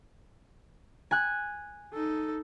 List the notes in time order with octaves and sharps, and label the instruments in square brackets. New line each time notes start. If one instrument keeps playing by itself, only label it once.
[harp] G#5 F#6
[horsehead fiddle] D#4 A4